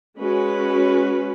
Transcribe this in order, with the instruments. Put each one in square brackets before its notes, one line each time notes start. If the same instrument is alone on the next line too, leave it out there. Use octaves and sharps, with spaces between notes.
[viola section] G#3 C#4 F#4 B4